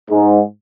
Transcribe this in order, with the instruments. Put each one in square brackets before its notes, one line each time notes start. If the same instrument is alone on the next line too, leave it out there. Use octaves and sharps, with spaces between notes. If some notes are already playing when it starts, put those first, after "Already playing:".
[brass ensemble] G#2